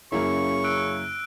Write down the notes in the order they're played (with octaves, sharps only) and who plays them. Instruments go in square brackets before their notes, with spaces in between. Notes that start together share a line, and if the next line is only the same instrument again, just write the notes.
[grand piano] F#2 A#3 E4 [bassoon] C#3 [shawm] C#6
[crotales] E6 F#6 D7